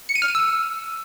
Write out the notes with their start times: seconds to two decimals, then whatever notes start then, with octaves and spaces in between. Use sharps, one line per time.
0.09 C#7
0.15 D#7
0.22 F6
0.28 D#7
0.35 E6